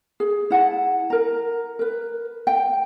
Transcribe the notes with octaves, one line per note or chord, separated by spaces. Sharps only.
G#4
E4 F#5 A5
A#4 A#5
A#4 B4
G5